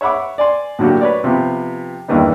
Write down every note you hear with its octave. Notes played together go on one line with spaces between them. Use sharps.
C#5 E5 F#5 B5 D6
D5 G#5 C6
A2 D3 F#3 A#3 F#4 G4
B4 C#5 D5
C3 F3 B3 G4
E2 G2 D#3 E3 A#3 D#4